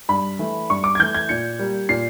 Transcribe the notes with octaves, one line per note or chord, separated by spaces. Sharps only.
G2 B5
E3 A3
G2 C#6
D6
G#6
E3 A3 G6
G#6
A#2 C#7
G3 A#3
A#2 C7